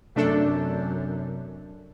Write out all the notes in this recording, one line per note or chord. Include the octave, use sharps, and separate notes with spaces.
F#2 C3 A3 D4 A4